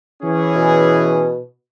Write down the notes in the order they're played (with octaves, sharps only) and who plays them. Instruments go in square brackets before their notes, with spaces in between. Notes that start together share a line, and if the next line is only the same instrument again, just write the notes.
[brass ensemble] E3 C#4 G#4
[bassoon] B2